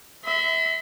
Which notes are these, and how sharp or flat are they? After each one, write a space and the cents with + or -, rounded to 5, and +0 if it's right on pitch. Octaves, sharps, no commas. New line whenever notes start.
E5 -25 B5 +45